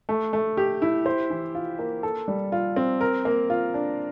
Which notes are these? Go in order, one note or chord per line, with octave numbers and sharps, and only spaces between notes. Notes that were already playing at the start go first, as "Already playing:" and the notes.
A3
A3
G4
E4
C5
E3
F4
A#3
A4
G3
F4
C4
A#4
A#3
F4
D4